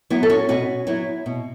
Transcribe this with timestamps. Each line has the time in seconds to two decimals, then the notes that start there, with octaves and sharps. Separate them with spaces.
0.10 F#3 B3 E4
0.23 A4
0.29 C#4 F#4
0.49 B2 C#4 F#4
0.87 F#3 B3 E4
1.26 B2